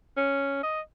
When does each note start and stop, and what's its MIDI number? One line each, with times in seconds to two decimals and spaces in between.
0.17 0.59 61
0.63 0.81 75